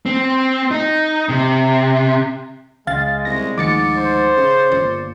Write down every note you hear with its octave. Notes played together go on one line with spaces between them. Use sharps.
C4
D#4
C3
C#2 G#3 F5 A6
C2 A#6
D2 G#2 D#3 F3 D6 A6 C#7
C5
C#3
G1 A#2